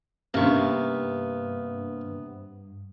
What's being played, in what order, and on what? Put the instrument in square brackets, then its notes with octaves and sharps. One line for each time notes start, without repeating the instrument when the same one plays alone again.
[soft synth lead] G2 [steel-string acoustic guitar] C3 B3 [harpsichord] A#3 C#6 [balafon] C#4 D4